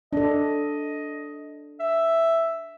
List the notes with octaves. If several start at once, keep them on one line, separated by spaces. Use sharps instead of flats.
D4 A4 D#5
E5